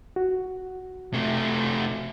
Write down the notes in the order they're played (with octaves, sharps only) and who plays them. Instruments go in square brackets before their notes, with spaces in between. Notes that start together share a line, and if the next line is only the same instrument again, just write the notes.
[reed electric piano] F#4
[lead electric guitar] C3 A3